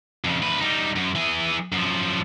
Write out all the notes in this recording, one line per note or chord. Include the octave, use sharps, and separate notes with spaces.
F2 C#3
D2 B4
G3 D#4
F#2
E3 G#4
F#2 F3